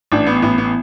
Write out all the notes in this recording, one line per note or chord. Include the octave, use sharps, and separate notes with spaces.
A1 D4
B3
A1 B3
B3